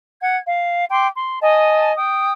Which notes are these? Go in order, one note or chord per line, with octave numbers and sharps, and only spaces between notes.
F#5 G#6
F5
G5 C6 D6
C6
D#5 G#5 A5
G5 D#6